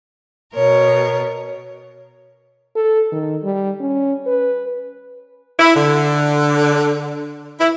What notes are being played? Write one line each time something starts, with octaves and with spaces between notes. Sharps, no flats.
B2 A#4 C#5
A4
D#3
G3
C#4
B4
E4
D3
E4